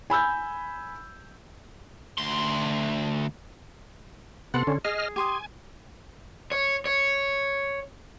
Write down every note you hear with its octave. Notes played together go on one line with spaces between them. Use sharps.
G#5 B5 E6 G6
D2 C6
C3 B3 A4 F#5 C6
D3 C#4
G#4 D#5 F6
G4 G#5 C6 D#6
C#5
C#5